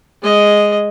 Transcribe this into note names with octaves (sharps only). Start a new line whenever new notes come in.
G#3 D#5